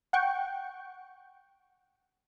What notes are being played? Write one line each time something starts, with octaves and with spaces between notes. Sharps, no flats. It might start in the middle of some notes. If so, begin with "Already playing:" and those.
F#5 G5 C#6